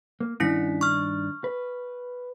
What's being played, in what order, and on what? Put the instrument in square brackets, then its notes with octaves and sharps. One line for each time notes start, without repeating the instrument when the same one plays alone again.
[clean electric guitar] A#3
[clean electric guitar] G2 D#3 D4 [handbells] C#4 E4 B6
[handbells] C#6 F6
[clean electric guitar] B4